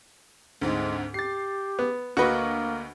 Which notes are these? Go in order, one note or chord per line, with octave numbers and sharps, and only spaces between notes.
D2 G#2 G#3 C4
G4 A6 C7
B3
D2 A#3 F#4 B4 D#5 C#6